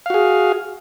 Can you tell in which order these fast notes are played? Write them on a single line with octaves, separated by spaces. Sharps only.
F5 F#4 G#4